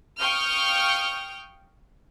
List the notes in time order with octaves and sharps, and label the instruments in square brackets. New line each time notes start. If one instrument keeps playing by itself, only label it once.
[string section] F5 G5 C#6 D#6 F6 G6